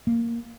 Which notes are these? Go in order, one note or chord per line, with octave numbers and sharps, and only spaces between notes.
A#3